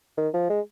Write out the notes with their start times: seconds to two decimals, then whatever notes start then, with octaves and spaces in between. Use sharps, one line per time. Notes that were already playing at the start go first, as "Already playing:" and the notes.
0.18 D#3
0.34 F3
0.50 G#3